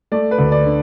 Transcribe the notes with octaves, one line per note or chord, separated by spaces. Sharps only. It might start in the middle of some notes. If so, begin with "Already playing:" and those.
A3 D5
B4
D2
D5
D3